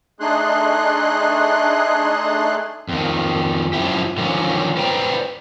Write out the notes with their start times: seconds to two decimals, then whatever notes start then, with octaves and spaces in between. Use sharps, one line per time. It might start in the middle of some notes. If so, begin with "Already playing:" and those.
0.20 A3 D4 D#4 G#4 C6 F#6
2.89 F2 D#3
3.73 F#2 F3 E4 G4
4.17 D3 D#3 F3 F#3 C#4
4.77 B4 C5 D5 G5 A#5